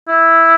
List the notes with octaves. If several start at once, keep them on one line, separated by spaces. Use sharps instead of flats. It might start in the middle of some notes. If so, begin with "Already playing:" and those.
E4